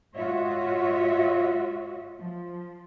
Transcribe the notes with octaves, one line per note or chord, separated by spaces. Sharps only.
G#2 F4 F#4 C#5 D#5 E5
F3